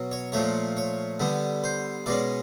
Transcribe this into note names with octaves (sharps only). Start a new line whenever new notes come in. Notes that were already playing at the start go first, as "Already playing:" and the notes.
Already playing: B2 F#3
C#5
A#2 F3 A3 C#5
C#5
D3 G3 B3
C5
B2 G#3 C#4 D5